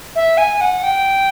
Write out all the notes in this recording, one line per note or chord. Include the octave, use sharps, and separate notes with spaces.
E5
G#5
F#5
G5